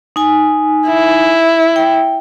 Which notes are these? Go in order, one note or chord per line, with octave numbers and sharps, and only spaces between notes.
D#4 G#5
E4
G5